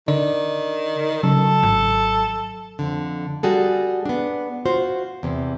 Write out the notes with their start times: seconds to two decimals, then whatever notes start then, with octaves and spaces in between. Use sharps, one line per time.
0.08 D3 D#3 D5
1.23 C#3 F#3 A4
1.63 G#1
2.79 F2 D3
3.43 G3 F#4 G#4 A4
4.05 B3 D4
4.65 F4 F#4 C5
5.23 E2 C3